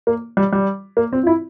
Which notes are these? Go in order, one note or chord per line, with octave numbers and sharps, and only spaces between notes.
A#3
G3
G3
A#3
C4
F4
E4